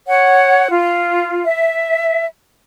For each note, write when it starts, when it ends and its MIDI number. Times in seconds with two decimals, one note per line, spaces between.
0.07 0.68 73
0.07 0.68 78
0.69 1.43 65
1.45 2.26 76